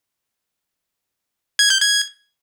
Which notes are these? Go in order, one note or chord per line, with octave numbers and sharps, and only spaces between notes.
G#6
G6
G#6